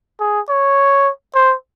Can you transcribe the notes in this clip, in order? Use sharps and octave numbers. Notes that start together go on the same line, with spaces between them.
G#4
C#5
C5